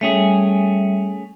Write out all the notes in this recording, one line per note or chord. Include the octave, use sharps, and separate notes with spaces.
G3 A3 C#4 G#4 E5